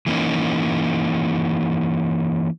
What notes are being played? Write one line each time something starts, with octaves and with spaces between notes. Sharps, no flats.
E3 A#3 C#4 D#4